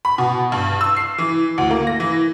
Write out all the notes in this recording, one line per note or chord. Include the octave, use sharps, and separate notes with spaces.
B5
B2
G2
E6
C7
E3
D2
A#3
A#6
E3